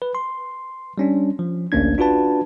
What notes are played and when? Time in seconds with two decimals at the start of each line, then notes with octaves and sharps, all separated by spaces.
0.02 B4
0.15 C6
0.98 G3 C#4 D4
1.39 F3
1.72 A1 D2 A#3 C#4 D4 G#6
1.98 D4 F4 F#4 B4 A5